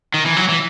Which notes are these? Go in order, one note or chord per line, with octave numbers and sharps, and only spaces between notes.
D#3
E3
F#3
E3